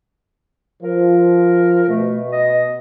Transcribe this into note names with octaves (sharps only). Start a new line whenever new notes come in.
F3 A#4
B2 A3
D#5